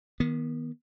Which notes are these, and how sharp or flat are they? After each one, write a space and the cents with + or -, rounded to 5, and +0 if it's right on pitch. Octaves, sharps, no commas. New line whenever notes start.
D#3 +15 B3 -25